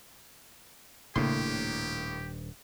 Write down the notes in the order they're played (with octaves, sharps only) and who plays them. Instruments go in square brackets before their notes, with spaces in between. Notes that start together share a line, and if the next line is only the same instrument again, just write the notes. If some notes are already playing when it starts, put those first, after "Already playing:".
[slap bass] D#1 D4 [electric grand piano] A2 A#3 [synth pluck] C#3 C6 [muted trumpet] G4